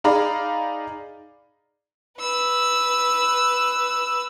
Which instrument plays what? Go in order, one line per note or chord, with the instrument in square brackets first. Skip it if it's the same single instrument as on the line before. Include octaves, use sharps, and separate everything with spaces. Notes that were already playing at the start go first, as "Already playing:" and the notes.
[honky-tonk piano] D#4 G#4 D5 F5 A#5 B5
[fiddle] B4 E6